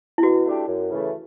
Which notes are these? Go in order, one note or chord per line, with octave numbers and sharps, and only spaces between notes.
E4
B2 F#4
A3 D4 G4
F#2
C#3 E3 A3